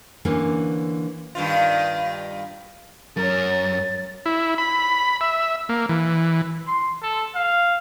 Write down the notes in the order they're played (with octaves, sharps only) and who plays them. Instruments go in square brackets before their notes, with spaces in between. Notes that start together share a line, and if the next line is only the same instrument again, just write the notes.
[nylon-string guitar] D3 E3 A3 A#3 C#4
[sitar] G2 D#3 F4
[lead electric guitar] F#2 [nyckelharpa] A#4 C#5 [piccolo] A6
[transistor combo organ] E4
B5
E5
A#3
E3
[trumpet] C6
A4
F5